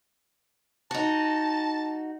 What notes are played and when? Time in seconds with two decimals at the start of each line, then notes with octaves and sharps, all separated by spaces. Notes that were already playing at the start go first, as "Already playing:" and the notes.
0.91 D#4 F#4 A5